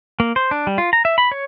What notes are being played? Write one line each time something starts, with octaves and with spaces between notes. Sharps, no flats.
A#3
C5
D4
G3
F4
A#5
E5
B5
C#5